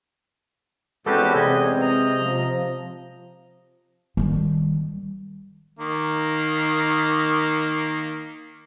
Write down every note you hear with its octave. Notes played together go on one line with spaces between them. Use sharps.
E2 G#3 C4 C#4 F#4 G4 A4 B4
C3 D#5 G#5
D#5 A#5
F3
D#3 G3
D#3 A#3